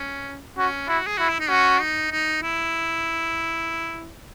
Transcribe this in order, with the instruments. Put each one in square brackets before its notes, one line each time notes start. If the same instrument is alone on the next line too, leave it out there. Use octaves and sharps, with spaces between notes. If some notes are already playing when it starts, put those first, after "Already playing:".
Already playing: [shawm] C#4
[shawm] C#4 [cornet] F#4
[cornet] E4 [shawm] F#4
[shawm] G#4
[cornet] E4 [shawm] F#4
[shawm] E4
D#4
[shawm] C#4 [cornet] F#4
[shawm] D#4
D#4
E4